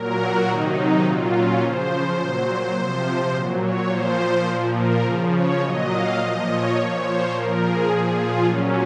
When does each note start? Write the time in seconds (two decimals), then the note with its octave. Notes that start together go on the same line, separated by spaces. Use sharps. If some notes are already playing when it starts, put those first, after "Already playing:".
Already playing: A#2 F#3 A#4
0.19 F#4
0.47 C3 D#3 F#3 D#4
0.76 D#4
1.04 A#2 F#3 F4
1.33 C#4
1.61 C#3 F3 C5
2.19 A#2 F#3
2.75 C3 F3 C5
3.33 A#2 F#3
3.61 C#5
3.89 A#2 F3 C5
4.47 A#2 F3
4.75 A#4
5.03 C#3 F3
5.32 C#5
5.60 A#2 F#3 D#5
5.89 F5
6.17 A#2 F3 D#5
6.46 C#5
6.74 A#2 F3
7.02 C5
7.31 A#2 F3 A#4
7.60 G#4
7.89 A#2 F3
8.18 F4
8.46 A#2 F#3 C#4